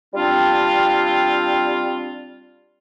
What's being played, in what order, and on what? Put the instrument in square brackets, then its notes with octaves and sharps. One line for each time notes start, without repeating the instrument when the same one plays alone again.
[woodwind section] G3 C4 D4 F4